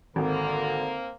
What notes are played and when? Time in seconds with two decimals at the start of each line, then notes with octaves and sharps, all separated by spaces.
0.16 G#1 D3 A#3 C4 A#4